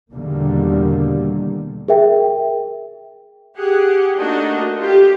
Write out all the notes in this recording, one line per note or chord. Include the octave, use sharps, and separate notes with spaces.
E2 B2 D3 D#3 G3 A#3
G#4 A#4 E5 G5
G4 G#4 F#5
A3 A#3 D4 D#4 F#4 D#5
F4 G4